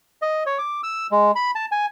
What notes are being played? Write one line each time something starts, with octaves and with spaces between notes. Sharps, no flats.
D#5
C#5
D6
E6
G#3
B5
A5
G#5